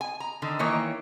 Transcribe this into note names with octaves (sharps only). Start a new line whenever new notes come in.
G#5
A#5
D3 D#3
D#3 E3 A#3 C#5